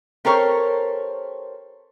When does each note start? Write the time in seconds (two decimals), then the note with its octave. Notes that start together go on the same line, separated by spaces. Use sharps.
0.25 C4 G4 A4 A#4 C5 C#5